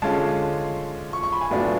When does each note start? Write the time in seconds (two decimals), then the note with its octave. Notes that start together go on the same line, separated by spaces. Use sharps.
0.02 D3 G#3 C#4 F4 A5
1.13 C#6
1.23 C#6
1.33 B5
1.41 G#5
1.51 A2 F#3 B3 D4 F4